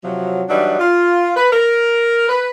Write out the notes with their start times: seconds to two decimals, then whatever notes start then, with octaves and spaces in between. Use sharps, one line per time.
0.03 C3 F3 F#3
0.49 E3 F#3 G3 D4 D#4
0.79 F4
1.36 B4
1.52 A#4
2.29 B4